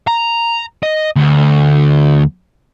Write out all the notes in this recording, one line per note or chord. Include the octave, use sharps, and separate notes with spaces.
A#5
D#5
D2